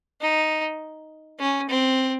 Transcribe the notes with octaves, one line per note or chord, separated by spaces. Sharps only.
D#4
C#4
C4